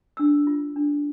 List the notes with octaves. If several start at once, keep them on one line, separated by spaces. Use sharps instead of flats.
D4 E6
F4
D4